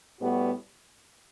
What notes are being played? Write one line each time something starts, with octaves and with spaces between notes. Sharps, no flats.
A2 G3 B3 F#4